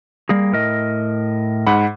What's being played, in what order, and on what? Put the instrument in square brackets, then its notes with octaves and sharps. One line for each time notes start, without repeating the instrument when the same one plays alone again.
[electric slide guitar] G3 A#3 G#4
A2 A#4 D#5
[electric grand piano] G#2 F#5 B5